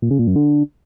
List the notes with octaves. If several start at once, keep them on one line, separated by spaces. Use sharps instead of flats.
A#2
C#3
A#2
F#2
D3